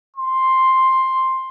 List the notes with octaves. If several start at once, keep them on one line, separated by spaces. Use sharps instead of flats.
C6